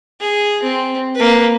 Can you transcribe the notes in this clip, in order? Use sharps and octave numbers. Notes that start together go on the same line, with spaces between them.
G#4
C4
A#3 B4